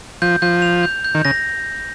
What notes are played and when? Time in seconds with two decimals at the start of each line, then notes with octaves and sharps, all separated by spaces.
0.22 F3 G6
0.42 F3 G6
0.62 F7
0.83 G6
1.04 G6
1.15 D#3
1.25 C#3 A#6